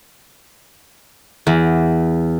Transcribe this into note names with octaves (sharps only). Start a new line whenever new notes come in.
E2